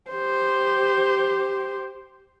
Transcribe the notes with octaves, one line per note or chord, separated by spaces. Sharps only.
G4 C5